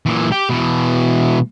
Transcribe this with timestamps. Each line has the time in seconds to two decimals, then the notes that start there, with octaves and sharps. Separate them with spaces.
0.06 A#2 E3
0.32 G4
0.50 B2 E3